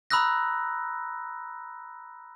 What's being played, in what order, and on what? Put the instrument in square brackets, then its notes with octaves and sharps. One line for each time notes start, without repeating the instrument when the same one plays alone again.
[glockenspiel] A#5 B5 D#6 E6 F#6 A#6